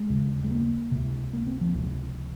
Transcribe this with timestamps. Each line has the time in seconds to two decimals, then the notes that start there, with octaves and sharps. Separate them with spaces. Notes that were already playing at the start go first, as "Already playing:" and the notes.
Already playing: G#3
0.09 D#2 C#3
0.44 G#3
0.51 A#3
0.91 C#2 C3
1.33 A#3
1.47 C4
1.61 F3
1.74 C#2 C3